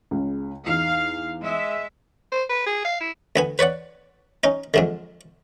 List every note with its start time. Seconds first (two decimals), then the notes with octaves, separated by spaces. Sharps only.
0.11 C#2 C#3
0.66 E2 D#4 F5
1.40 G#3 E5
2.32 C5
2.49 B4
2.66 G#4
2.85 F5
3.00 E4
3.36 D2 B3 G#5
3.59 B4 C#5 D5 F#5
4.44 C#4 D#4
4.74 F2 G#2 D3